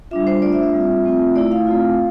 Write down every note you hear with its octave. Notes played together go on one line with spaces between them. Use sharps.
G3 D4 F4 E5
C5
A3 D4 F4 D5
E5
E5
G3 C4 F4
A3 C4 F4
A3 E4 D5
F5
A3 C4 F4